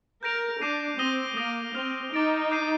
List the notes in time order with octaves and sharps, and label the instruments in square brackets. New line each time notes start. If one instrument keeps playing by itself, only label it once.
[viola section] A#4 [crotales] G6 A#6 D7 F7
[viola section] D4 [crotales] D6 G6 C7 D#7
[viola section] C4 [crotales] D#6 A#6 D#7 G7
[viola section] A#3 [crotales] D#6 A#6 D7 F7
[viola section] C4 [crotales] F6 A#6 F7
[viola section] D#4 [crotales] D6 A6 D7
[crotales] D6 G6 C7 D#7